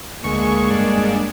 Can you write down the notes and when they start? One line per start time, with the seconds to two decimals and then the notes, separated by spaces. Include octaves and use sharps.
0.24 D2 G#3 A#3 G#4 C#6
0.70 G2 D4